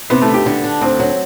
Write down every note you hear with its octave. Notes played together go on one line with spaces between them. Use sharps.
C3 B3
A3
D2
G4
D3
D4
D2 C4
F#3